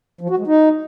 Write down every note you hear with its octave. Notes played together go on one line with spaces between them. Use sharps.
F3
F#4
G#3
D#4